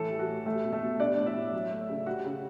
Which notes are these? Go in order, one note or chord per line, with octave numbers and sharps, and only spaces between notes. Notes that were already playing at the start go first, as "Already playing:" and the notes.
Already playing: A2 E3 A3 A4
G3
F#4
A2
G3 A3 A4
B2
A3 A4
B2
G3 D4 D5
A2
E4 E5
A2
F#3
A3
C#3
G3 F#4 F#5
C#3